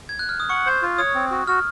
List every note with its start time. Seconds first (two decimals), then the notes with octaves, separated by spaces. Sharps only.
0.09 G#6
0.19 F#6
0.29 F6
0.40 D#6
0.49 F#5 C#6
0.66 C5
0.82 F4
0.98 C#5 D#6
1.15 C4
1.31 F#4
1.47 F#4 F6